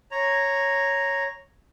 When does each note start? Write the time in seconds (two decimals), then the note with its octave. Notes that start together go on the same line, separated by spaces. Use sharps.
0.11 C#5 A#5